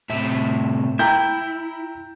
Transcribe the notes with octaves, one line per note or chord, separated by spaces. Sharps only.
A2 C3 E5
E4 G5 A#5 G6